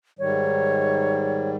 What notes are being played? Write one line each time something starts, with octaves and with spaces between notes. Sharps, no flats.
G#2 D#3 G3 C#5